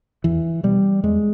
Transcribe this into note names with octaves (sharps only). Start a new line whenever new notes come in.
E2 E3
B2 G3
E2 G#3